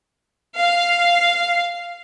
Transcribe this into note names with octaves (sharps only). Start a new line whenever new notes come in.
F5